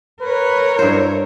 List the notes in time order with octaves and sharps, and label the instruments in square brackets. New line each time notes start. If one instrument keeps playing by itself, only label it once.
[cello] A#4 C#5 [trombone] B4
[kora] G2 C5 [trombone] E4